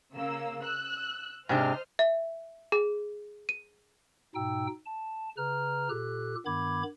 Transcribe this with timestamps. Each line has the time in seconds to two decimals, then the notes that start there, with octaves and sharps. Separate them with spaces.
0.14 C#3 A#3 E6
0.61 E6 F#6
1.49 G#2 C3 D4 C5 D#5 F6
1.99 E5
2.72 G#4
3.49 D#7
4.35 G#2 B2 D#4 G5 E6
4.86 A5
5.37 C#3 B4 A#5 F6
5.90 A#2 G4 A4 F#6
6.46 G2 D#3 B3 B5 D6 G#6